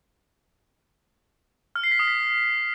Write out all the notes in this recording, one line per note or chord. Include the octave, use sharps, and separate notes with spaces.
F6
C7
B6
D#6
B6